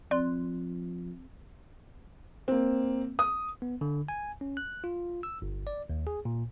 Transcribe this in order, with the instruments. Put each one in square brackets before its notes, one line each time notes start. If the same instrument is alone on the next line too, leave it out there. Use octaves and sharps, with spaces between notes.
[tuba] F3 [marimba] C4 [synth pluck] D5 C6 F#6
[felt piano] A#3 C4
D#6
[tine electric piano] B3
D3
G#5
C#4
F#6
F4
E6
G1
D5
D#2
G#4
A#2